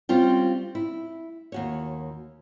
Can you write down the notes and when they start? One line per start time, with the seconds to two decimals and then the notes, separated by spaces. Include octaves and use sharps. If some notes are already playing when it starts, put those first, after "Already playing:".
0.09 G3 C4 C#4 F4 G5
0.75 E4
1.52 D#2 F#4 C#5